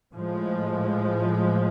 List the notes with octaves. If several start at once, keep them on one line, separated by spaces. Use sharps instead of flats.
A2 F3 G#3